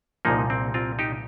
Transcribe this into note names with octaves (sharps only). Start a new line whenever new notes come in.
C2 A#2 F3 A#3 D#4
C4
C4 F4
D#4 G4